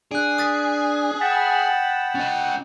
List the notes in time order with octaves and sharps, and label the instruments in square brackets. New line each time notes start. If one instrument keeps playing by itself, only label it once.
[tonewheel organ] D4 [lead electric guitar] G#4 [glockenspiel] F#6 D7
[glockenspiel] D#6 A6 B6
[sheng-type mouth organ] F#5 G5 [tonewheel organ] A5 B5
[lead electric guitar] C#4 D#5